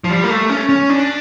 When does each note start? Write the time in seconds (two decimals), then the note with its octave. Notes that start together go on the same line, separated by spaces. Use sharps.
0.04 F3
0.10 G3
0.24 A#3
0.30 A3
0.50 C#4
0.69 C#4
0.90 D4